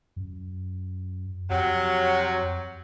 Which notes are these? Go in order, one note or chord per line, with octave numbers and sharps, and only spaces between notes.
F#2
F2 C3 F#3